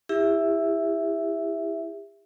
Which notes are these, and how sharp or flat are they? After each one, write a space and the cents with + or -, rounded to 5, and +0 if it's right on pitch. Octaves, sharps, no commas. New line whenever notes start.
E4 +0 G4 +40 E5 +0